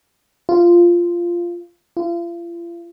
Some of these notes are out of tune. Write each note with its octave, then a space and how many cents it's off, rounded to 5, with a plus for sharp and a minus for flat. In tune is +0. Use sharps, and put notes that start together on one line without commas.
F4 -10
F4 -40